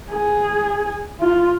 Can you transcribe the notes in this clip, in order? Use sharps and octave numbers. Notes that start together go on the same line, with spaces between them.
G#4
F4